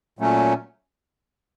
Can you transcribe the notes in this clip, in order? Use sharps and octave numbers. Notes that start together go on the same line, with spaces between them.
A#2 F#3 A3 C#4